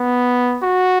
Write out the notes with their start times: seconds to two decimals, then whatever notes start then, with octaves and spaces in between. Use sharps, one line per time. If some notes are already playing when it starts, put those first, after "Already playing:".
Already playing: B3
0.63 F#4